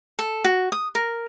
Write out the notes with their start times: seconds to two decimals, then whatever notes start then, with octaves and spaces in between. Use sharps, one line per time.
0.19 A4
0.44 F#4
0.72 D#6
0.95 A#4